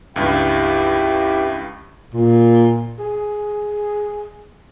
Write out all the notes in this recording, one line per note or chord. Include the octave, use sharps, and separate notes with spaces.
C#2 G2 E4 G4
A#2
G#4